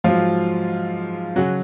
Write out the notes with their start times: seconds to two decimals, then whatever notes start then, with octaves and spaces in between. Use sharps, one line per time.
0.04 G#2 F3 F#3 F4
1.36 C#3 F#3 F#4